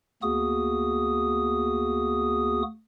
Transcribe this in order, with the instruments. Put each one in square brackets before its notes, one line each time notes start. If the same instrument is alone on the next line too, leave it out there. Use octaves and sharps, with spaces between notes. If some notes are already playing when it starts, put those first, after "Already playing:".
[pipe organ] D2 A#3 B3 F#4 G#4 D#6